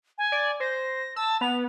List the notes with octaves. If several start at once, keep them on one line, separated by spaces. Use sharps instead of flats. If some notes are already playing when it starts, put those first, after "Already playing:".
G#5
D5
C5 A#6
A5 E6
B3 F7